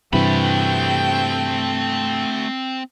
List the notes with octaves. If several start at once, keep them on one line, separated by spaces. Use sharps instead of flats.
G2 C3 E3 A3 C4 F#4 G5 B5